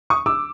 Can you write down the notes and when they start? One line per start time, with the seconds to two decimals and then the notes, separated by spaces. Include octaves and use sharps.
0.10 C#6 D#6
0.26 D6 E6